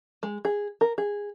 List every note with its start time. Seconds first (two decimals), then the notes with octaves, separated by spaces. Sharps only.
0.23 G#3
0.45 G#4
0.81 A#4
0.98 G#4